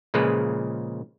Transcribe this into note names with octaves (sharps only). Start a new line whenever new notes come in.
A#2 C#3 F3 G#3 B4